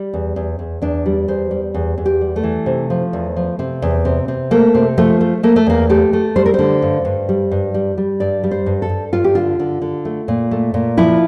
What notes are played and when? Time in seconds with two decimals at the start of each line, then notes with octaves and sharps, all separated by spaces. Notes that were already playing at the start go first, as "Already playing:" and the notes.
Already playing: G3
0.14 E2
0.36 E2
0.59 E2
0.82 E2 D4
1.06 G3
1.28 E2 C5
1.51 G3
1.74 E2
1.98 E2
2.06 G4
2.21 G3
2.36 A3
2.43 E3
2.66 C3
2.90 F3
3.13 E2
3.36 F3
3.59 C3
3.82 E2
4.05 C3
4.28 C3
4.51 A3 A#3
4.75 C3
4.98 F3 A3
5.21 A3
5.43 A3 A#3
5.56 A3
5.66 E2 A#3
5.89 A3 G4
6.13 A3
6.36 G3 C5
6.46 A#4
6.54 D3 C5
6.82 G2
7.05 G2
7.29 G3
7.51 G2
7.74 G3
7.98 G3
8.20 G2 D5
8.43 G3
8.51 C5
8.66 G2
8.82 A4
8.89 G2
9.13 G2 F4
9.24 G4
9.35 D3 F4
9.59 D3
9.82 D3
10.05 A3
10.28 A#2
10.51 A3
10.74 A#2
10.97 F3 E4